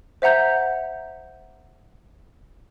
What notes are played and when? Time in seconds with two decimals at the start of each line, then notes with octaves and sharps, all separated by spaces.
0.22 C5 E5 F#5 A#5 G6